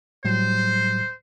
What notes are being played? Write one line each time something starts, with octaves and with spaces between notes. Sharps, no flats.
A2 F#3 G3 C5